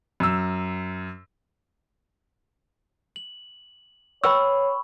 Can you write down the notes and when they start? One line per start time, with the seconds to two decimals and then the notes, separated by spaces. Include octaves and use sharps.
0.20 F#2 E6
3.16 F#7
4.24 B4 C#5 G5 B5 C#6 E6